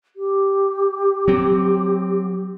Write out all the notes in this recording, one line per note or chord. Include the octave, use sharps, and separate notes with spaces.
G4
F#3 C4